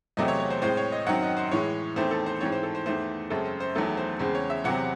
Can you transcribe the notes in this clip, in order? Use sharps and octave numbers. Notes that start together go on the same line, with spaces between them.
E2 C3 F#3 A3 C4 D#5
C#5
C#5
C5
A2 G#3 C4 C5
C#5
D#5
F#2 D#3 F#3 C4 F#5
D#5
C5
A2 E3 G#3 C#5
E2 D#3 A3 C4 C5
A4
C5
G#2 E3 C4 C#5
C5
A4
C5
E2 D#3 A3 C5
F#2 C#3 G#3 C4 A4
C5
C5
E2 D#3 F#3 A3 A4
C5
E2 C#3 G#3 C4 C5
C#5
E5
E2 C3 F#3 C4 F#5